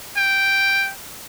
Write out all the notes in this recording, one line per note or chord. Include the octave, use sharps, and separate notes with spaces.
G5